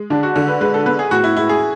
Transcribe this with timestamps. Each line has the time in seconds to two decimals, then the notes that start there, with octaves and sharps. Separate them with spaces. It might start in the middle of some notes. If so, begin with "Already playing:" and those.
Already playing: G#3
0.10 D3 D4
0.23 F#4
0.35 D3 A4
0.48 B4
0.61 G#3 B4
0.74 A4
0.86 B3 B4
0.99 G#4
1.11 A2 F#4
1.24 E4
1.37 G#3 E4
1.49 G#4